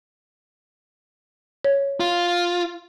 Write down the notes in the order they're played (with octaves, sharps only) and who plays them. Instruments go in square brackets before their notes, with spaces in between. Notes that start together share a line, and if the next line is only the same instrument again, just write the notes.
[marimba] C#5
[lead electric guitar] F4